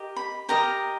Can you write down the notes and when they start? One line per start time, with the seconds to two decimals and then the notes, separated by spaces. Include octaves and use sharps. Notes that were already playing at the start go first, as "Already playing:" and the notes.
Already playing: G4 A#4 D#5
0.16 B5
0.49 G4 A#4 D#5 A#5